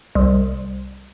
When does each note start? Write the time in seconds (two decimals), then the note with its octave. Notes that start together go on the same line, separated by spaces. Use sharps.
0.15 C2